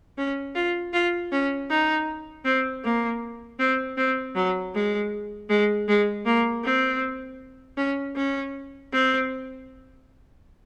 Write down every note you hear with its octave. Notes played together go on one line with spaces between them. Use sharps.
C#4
F4
F4
C#4
D#4
C4
A#3
C4
C4
F#3
G#3
G#3
G#3
A#3
C4
C#4
C#4
C4